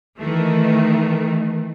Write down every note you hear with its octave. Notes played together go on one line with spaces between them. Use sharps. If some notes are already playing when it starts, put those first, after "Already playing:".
D#3 E3 A3